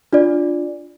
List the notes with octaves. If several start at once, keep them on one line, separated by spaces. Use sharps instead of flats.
D4 F4 D5